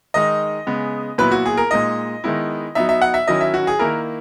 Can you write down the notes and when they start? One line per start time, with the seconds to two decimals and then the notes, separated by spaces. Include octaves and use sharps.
0.14 D#3 G#3 D#4 D#5
0.67 C#3 G#3 B3
1.18 A#2 F#3 B3 E4 B4
1.31 F#4
1.46 G#4
1.57 A#4
1.71 A#2 G#3 D#4 D#5
2.24 D#3 G#3 B3 E4
2.75 F#3 B3 D#4 E5
2.89 E5
3.02 F#5
3.14 E5
3.27 D#3 F#3 C#4 E4 D#5
3.41 E5
3.54 F#4
3.67 G#4
3.79 D#3 A#3 E4 A#4